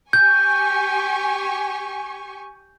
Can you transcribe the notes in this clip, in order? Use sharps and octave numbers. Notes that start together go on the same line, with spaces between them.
G4 G#5 C#6 G6